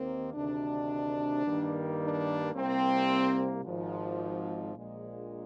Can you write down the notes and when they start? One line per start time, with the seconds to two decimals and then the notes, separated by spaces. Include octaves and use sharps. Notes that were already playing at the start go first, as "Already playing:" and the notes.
Already playing: D#2 D#3 A#3 C4
0.34 D2 C3 D#3 D4
1.45 G2 D#3 G3 A#3
2.00 D4
2.55 C2 C3 G3 A#3 C4
3.65 G#1 G#2 F3
4.75 A#1 A#2 G#3